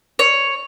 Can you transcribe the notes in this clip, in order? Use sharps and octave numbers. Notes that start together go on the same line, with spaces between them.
C#5